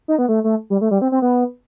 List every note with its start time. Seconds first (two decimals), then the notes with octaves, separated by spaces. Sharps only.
0.08 D#4
0.18 B3
0.29 A3
0.44 A3
0.70 G3
0.81 A3
0.91 G3
1.02 C4
1.12 C4
1.22 B3